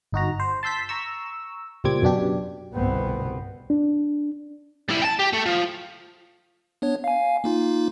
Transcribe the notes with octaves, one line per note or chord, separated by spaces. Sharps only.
G1 D#4 F#4 A#5
C5
A5 C6 E6 G6 B6
A#5 C#6 E6
C#2 A#2 G3 C4 D6 G#6
F#2 B2 D4 G4
G1 C2 G2 B2 B3 C4
D4
G3 E4
G5 A5
G4
A3
F3
B3 D4 C#5
F5 G#5
A#3 D#4 F4